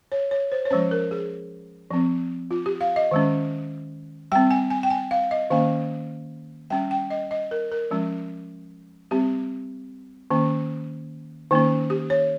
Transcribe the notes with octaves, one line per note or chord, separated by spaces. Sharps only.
C#5
C#5
C5
C#5
F3 G#3 C#4 C5
A#4
G#4
F3 C4
F4
G4
F5
D#5
D#3 G#3 C#4
G3 C4 G5
G#5
G#5
G5
G#5
F5
D#5
D#3 A#3 C#4 F5
G3 C#4 G5
G5
D#5
D#5
A#4
A#4
F3 G#3 C#4
G3 C4 G4
D#3 A#3 C#4
D#3 A#3 C#4 D#4
G4
C#5